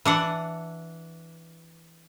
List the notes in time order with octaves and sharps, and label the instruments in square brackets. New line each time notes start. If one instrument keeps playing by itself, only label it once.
[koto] E3 D4 F#5